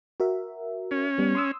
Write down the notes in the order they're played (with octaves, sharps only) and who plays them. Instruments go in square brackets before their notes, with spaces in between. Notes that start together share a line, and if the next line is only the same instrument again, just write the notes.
[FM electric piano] F#4 A#4 E5
[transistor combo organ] C#4
[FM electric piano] G3 B3
C6 D#6 E6